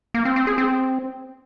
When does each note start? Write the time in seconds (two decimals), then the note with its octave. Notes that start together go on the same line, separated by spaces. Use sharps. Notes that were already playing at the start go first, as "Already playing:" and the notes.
0.14 A#3
0.25 C4
0.36 C4
0.47 G#4
0.58 C4